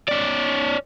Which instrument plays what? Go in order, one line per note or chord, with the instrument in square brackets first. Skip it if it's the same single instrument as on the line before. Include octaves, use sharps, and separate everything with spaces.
[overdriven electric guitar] C#4 D5